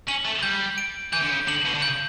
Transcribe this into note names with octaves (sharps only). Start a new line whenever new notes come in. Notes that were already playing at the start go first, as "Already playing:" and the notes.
C#4 F#7
A3
G3 G6
D7
E3 G6
D3
C#3
D3 F#7
B2
D3
C#3 G6